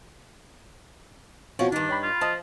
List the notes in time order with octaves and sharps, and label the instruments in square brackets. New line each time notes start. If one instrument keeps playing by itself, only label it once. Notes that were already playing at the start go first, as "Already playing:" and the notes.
[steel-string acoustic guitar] B2 F3 C#5 [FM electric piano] C4 F4 F#4
[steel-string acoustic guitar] G2 D#4 [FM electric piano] D#3 [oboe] D4
[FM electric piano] C#5 G5 B5
[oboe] F4
[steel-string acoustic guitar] F3 [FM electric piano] D#5 A5